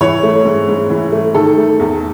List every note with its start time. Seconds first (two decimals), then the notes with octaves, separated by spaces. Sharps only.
0.01 E3 C#5
0.23 A3
0.45 G#2
0.68 G#2
0.90 E3
1.12 A3
1.35 D#3 A4
1.58 A3
1.80 E2